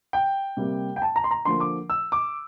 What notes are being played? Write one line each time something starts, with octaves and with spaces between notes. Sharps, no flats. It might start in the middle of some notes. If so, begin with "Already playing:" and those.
G5
C3 G3 A#3
G5
A5
A#5
C6
A#5
D3 F3 A#3 C6
D6
E6
D6